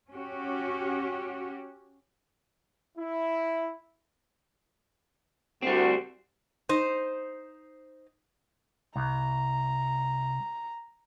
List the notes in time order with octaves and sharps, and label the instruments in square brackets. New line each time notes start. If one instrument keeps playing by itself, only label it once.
[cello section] C#4 F#4 G4
[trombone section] E4
[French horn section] D2 F#4 [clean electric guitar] G3 C4
[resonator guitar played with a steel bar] D#4 C5
[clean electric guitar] C2 [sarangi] A#5